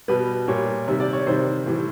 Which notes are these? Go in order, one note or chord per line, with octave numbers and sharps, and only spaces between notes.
B2 G3 B4
A#2 G3 C#5
C3 D#3 G3
D5
C#5
C3 D#3 G3 C5
A2 E3 G3